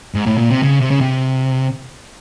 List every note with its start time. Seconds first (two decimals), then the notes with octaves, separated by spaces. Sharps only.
0.15 G#2
0.26 A2
0.38 A#2
0.50 C3
0.63 C#3
0.80 C3
0.91 C#3
1.01 C3